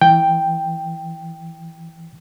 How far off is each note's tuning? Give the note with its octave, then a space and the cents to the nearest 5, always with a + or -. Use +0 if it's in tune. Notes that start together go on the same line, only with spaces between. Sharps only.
E3 +0 G5 +0